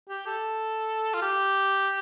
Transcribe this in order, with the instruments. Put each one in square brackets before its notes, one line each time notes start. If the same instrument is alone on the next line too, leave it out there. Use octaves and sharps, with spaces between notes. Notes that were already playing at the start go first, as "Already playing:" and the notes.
[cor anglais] G4
A4
F4
G4